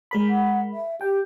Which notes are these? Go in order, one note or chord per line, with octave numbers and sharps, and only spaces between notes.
G#3 A#4 B5
F#5
E5
G4 G5